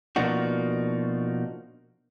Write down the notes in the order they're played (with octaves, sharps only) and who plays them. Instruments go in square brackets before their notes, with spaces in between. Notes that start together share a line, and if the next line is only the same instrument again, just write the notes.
[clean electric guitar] B2 F3 A#3 D4 D#4 F#4